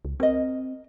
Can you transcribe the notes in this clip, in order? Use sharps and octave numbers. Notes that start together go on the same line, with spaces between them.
C#2
C4 A#4 D#5